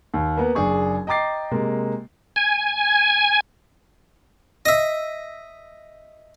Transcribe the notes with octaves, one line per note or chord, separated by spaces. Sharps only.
D#2
A#3 B3 B4
F#1 D4 G#4 C#6
D#5 G5 A#5 D6 A6 C7
C3 G#3 A#3
G#5
D#5 E5